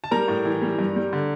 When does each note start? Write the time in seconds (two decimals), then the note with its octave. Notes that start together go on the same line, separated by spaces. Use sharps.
0.04 A5
0.11 G3 A#4 A#5
0.28 A2
0.45 E3
0.62 G3
0.79 G2
0.96 G3
1.13 D3